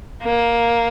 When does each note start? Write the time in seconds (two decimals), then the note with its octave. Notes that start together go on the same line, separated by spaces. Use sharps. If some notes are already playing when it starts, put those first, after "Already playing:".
0.23 A#3